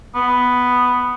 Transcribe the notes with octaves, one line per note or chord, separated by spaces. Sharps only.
B3